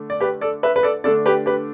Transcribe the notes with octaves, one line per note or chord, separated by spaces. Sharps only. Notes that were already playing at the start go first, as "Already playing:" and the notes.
Already playing: D3 A3 D4
D5
G4 B4
A4 D5
B4 E5
B4
A4 D5
D3 A3 D4 A4 D5
G4 B4
G4 B4